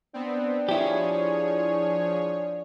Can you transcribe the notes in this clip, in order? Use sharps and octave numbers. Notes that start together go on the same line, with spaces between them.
B3 C4 D4
F3 E4 G4 G#4 C#5